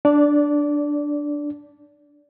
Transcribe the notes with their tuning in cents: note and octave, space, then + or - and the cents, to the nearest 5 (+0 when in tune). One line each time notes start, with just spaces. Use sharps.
D4 +0 D5 -20